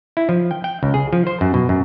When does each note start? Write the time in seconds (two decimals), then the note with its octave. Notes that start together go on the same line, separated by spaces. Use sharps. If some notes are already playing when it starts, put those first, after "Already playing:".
0.17 E4
0.29 F3
0.51 G5
0.64 G5
0.83 C#2
0.94 G#4
1.13 F3
1.27 C5
1.41 F#2
1.54 B2
1.69 F#2